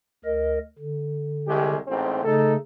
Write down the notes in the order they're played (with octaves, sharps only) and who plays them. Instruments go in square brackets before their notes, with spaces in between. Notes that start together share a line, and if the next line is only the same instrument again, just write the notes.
[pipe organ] D2 A#4 D#5
D3
[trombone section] C2 G#3 G4
A1 G#2 C4
[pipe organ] C#3 A3 [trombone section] D#4 A4